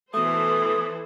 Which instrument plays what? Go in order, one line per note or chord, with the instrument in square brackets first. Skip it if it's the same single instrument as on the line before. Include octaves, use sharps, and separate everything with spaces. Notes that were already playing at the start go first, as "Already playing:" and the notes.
[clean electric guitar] B2 A3 [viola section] E3 A4 C5 [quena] D#6